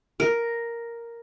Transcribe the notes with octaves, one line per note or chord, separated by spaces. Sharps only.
A#4